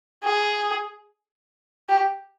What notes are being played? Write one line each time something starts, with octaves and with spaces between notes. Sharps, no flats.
G#4
G4